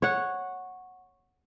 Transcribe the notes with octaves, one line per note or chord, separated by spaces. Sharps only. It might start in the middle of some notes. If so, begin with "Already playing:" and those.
C#5 F#5